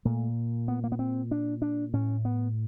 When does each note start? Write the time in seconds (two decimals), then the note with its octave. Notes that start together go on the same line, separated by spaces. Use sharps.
0.05 A#2 A3
0.68 B3
0.84 A#3
0.92 B3
0.99 C4
1.31 D4
1.62 D4
1.93 A2 C#4
2.25 B3